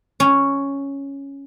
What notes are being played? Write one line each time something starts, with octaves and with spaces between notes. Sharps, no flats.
C#4